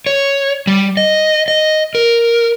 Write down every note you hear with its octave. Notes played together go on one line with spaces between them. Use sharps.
C#5
G3
D#5
D#5
A#4